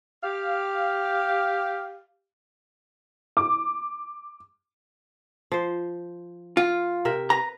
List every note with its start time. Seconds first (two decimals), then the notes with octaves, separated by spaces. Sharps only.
0.24 G4 F5
3.37 D6
5.52 F3 C5
6.57 F4
7.05 C3 A#4 E5
7.30 B4 A#5